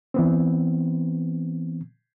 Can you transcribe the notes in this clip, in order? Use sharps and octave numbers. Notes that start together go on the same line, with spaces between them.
E3 B3 C4